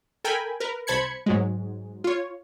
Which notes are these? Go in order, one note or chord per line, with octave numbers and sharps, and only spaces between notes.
A4 A#4 G5 G#5 B5
A#4 B4
C2 C5 A5 B5 G#6 C#7
G#2 F#3 G#3
F4 C#5